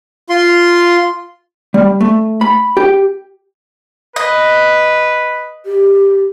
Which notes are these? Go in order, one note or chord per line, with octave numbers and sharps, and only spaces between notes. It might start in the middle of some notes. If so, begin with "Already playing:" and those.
F4 C6
G3
A3
B5
G4
B4 D#5
G4